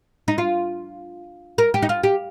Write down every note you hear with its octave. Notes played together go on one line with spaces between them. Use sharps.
D#4
F4
A#4
G4
D#4
F4
G4